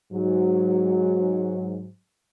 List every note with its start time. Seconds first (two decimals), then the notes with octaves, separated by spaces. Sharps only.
0.12 G#2 F#3